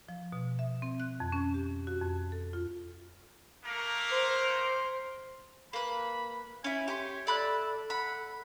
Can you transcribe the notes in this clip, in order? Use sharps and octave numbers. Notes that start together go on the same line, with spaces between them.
F3
B2
E5
C4
F#6
F2
C#4
G4
F#4
F2
A4
F4
A3 A#3 A#4
C5
A#3 B4 B5
C#4 E4 G#5
G4 C#5 C6
A4 D5 E5 B5 F#6
F#5 B5